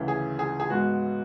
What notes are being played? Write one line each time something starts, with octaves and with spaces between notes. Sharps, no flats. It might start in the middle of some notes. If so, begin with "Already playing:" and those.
Already playing: D2 C#3 E3
G#4
G#4
G#4
G#2 G#3 B3 F#4